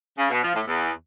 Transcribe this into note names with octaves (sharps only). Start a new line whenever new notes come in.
C#3
B2
F3
A2
E2